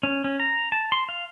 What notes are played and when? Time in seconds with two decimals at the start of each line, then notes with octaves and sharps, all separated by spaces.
0.03 C#4
0.24 C#4
0.40 A#5
0.72 A5
0.92 C6
1.09 F5